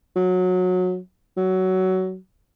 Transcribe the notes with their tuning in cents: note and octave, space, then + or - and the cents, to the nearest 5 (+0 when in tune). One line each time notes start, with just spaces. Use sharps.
F#3 -20
F#3 +15